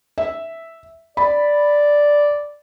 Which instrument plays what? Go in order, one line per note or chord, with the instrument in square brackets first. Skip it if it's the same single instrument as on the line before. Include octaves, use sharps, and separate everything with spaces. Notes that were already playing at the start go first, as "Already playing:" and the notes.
[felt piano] E5
[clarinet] D5 [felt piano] B5